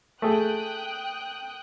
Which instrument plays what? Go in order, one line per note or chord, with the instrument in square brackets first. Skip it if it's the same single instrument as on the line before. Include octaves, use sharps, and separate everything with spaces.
[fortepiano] A3 G#4 [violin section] G5 D#6 F#6